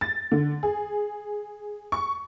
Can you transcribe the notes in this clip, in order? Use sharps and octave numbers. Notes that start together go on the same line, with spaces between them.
A6
D3
G#4
C#6